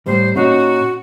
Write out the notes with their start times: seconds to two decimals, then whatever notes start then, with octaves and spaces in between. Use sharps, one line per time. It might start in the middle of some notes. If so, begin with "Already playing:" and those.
0.06 A2 G3 C5
0.36 A#2 C#4 D#4 F#4